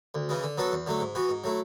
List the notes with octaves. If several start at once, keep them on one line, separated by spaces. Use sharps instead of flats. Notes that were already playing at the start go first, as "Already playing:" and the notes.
D2
C#3 E3 G#3
D3
F#3 B3 F#4 A4
E2
D3 F#3 A3
G#2
E3 B3 F#4
G#2
F#3 A3 E4